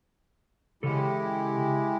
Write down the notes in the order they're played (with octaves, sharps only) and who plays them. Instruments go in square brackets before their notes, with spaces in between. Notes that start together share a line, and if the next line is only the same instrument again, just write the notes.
[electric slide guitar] C#3 A4 [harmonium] G#3 E4 G4